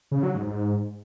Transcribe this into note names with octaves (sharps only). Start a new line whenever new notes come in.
C#3
F#3
G#2
G#2